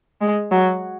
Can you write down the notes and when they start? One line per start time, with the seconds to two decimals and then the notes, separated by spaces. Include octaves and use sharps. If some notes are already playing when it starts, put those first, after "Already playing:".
0.21 G#3
0.51 F#3